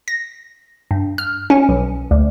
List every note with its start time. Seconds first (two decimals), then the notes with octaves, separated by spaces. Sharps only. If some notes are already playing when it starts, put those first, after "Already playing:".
0.08 A#6
0.91 G2
1.18 F6
1.50 C#4
1.69 B1
2.11 D2